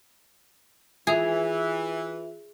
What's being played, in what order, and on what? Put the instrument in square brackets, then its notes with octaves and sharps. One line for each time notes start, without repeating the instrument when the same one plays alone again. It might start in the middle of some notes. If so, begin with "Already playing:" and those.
[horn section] E3 [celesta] F4 E5 F7 [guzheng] G#4